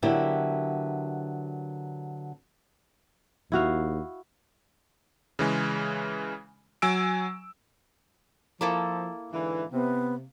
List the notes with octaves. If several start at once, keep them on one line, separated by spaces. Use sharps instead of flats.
D3 F#3 B3 E4 G4 A#4
D#2 E4 F#4 F5
C#3 E3 G#3
F#3 G#5 E6 D7
F3 A#3 E4 A4
G#2 D3 E3
C3 B3